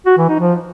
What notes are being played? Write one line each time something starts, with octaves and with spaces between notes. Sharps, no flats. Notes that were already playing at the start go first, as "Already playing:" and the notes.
F#4
E3
D#4
F3